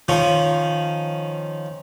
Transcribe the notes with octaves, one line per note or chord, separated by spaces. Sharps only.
D#3 F3 C#4